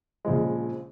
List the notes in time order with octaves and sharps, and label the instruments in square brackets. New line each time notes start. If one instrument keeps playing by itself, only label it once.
[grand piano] A#1 C#3 F3 G#3